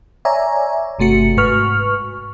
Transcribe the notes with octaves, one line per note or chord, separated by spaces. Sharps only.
C#5 D5 E5 G#5 A#5
G1 C3 A3 F#4 C#7
G#2 F#4 B4 C#6 F6